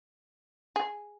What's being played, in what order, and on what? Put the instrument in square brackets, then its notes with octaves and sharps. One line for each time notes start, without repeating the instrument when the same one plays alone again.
[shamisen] G#4